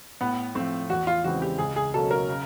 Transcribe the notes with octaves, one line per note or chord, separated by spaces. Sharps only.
A2 B3
F3 A3 C4
E2 F#4
F4
C#3 E3 G#3 C4 F#4
G4
C#2 G#4
G#4
B2 F#3 A#3 C#4 A4
A#4
C#3